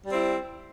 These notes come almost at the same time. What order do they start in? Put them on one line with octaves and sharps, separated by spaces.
G3 C4 E4